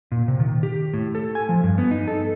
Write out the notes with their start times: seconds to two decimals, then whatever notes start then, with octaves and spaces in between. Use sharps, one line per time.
0.12 A#2
0.28 C3
0.40 D#3
0.63 G4
0.94 A2
1.15 A4
1.35 G#5
1.49 F3
1.63 G2
1.78 B3
1.91 D#4
2.08 A4